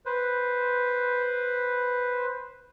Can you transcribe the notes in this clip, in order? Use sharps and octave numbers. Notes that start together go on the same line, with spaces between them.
B4 C5